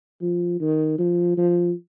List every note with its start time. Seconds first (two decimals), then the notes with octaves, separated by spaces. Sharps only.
0.22 F3
0.60 D#3
0.98 F3
1.37 F3